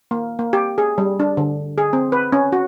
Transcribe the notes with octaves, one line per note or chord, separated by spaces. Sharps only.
A#3
A#3
G4
G#4
G3
D4
D3
G#4
C4
B4
C#4
F#4